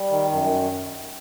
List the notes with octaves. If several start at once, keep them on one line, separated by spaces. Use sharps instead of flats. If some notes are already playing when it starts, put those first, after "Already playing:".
Already playing: G3
D#3
F#2